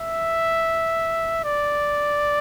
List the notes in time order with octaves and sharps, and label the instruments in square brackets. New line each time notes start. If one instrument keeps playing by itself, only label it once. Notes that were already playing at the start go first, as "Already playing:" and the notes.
Already playing: [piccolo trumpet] E5
D5